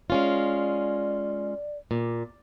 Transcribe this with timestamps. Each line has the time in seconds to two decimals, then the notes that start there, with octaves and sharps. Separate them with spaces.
0.10 G#3 C#4 F4 D5
1.91 A#2